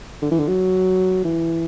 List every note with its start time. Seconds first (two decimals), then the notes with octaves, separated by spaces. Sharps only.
0.22 D3
0.31 E3
0.39 D3
0.48 F#3
1.25 E3